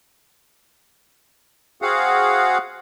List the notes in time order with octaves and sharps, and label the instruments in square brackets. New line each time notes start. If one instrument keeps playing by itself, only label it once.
[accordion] C4 F#4 G#4 F5 F#5